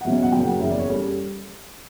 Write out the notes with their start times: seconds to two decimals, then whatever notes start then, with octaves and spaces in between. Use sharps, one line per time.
0.01 F#5
0.05 E2 B2 F#3 C#4 E5
0.23 F#5
0.32 F#1 F#2 C#3 F#3 G5
0.47 F#5
0.61 F#1 E2 C#3 E5
0.70 D5
0.79 C#5
0.89 G3 C#4 A4